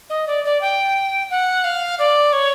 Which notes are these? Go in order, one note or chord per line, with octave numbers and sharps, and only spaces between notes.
D#5
D5
D5
G5
F#5
F5
D5
C#5